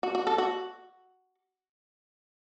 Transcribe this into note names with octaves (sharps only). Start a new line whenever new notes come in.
F#4
F#4
A4
F#4